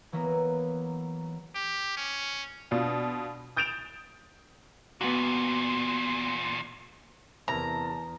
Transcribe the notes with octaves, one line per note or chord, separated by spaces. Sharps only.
E3 F#3 A#3 B3
G4
C#4
B2 D4 F4
D#6 G6 A6 D7 E7 F7
E2 A#2 B3 F#4
E2 C3 E4 A#4 A5 A#5